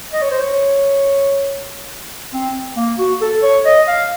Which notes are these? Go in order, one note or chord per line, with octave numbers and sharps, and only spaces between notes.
D#5
C#5
C5
C#5
C4
A#3
F#4
A4
C#5
D#5
F5